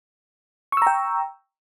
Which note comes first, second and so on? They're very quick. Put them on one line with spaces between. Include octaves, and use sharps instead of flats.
C#6 E6 A#5 G5